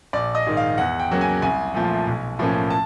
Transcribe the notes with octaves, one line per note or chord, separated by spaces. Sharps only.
A#1 D5
D#5
G#2 D#3
F5
E2 F#5
G5
C#3 F#3 A#3 C#4
G#5
C2 G#5
A#2 F3 A3
B1
A2 F3 A#3 C#4
A5